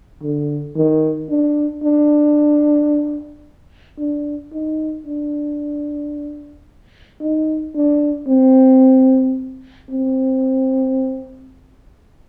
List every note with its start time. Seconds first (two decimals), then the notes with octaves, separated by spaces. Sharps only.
0.23 D3
0.76 D#3
1.30 D4
1.84 D4
3.99 D4
4.53 D#4
5.07 D4
7.21 D#4
7.76 D4
8.28 C4
9.90 C4